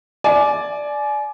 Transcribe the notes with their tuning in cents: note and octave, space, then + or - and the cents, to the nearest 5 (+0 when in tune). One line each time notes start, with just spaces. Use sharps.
D5 +0 G#5 +30